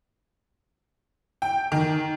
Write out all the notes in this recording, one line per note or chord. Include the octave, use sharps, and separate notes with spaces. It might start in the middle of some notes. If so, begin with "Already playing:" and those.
G5
D#3